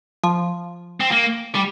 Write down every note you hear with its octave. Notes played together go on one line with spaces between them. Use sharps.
F3
C4
A#3
G3